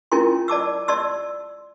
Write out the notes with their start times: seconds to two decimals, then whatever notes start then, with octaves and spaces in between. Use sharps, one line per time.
0.12 C#4 E4 F4 A#4 G#5 C6
0.48 D5 A5 D6 E6
0.88 D5 A5 C6 E6